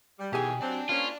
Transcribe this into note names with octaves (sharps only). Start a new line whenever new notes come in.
G3
B2 D#3 E3 G4 G#4 G#5
F#3 C4 D5 A5
A#3 C4 C#4 F4